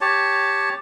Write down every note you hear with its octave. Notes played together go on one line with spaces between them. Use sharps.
G4 C#5 A5